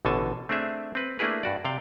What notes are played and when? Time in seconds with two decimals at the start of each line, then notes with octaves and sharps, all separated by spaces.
0.05 A1 B2 D3 A4 G#5 A5
0.49 A3 C4 D4 G#4 E5
0.95 C4 B4
1.19 A3 A#3 D4 E4 G#4 B4
1.43 G2 F#4 D5
1.65 C3 D5 F5 G5